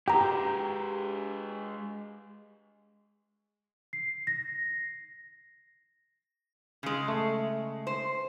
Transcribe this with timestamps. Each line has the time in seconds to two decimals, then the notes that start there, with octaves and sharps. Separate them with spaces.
0.08 G#3 G4 B4 G5 A#5
3.93 C7
4.27 A#6
6.83 C#3 G#3
7.08 A3
7.87 C5